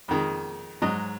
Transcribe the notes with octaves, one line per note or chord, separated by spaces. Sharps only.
F2 D#3 G#3
G#2 F#3 D#5